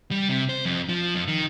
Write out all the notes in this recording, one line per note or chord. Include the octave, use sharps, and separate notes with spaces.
G3
C3
C5
F2
F3
F2
D#3